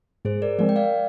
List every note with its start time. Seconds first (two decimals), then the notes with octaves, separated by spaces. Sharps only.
0.25 G#2 G#4 C5
0.42 A#4 D5
0.58 F3 G#3 C4 A#4 D5
0.69 G5
0.76 D5 F5